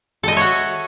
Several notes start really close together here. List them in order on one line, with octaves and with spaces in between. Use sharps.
A4 D#5 E5 C#5 F#4